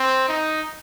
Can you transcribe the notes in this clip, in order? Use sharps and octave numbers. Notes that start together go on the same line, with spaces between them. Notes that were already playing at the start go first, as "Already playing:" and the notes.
Already playing: C4
D#4